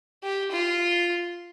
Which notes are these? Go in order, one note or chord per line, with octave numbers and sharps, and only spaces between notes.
G4
F4